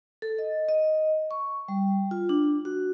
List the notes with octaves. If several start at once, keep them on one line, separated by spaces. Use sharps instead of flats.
A4
D#5
D#5
C#6
G3
F4
D4
F#4